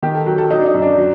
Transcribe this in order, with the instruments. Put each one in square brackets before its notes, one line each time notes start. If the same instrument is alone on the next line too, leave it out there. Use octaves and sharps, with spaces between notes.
[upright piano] D#3 G4
A4
F#3
A4
F#3 D#4
D4
D#4
F#2
D4
F#3